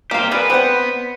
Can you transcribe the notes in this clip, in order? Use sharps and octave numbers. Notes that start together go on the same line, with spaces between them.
A#3 G4 C5 F5
B3 G#4 A#4 B4 D5
C4 B4 C5 F#5